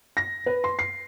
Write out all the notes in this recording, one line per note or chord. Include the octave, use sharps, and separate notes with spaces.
A#6
B4
C6
C7